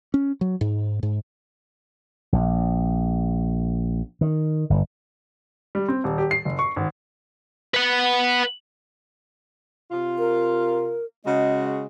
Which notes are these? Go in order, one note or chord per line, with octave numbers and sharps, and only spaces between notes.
C#4
F#3
G#2
G#2
A#1
D#3
G1
G3
C4
D#1
G4
C7
F#1
C#6
G#1
B4 F#5
C3 F4
A#4
C#3 G#3 F#4 D#5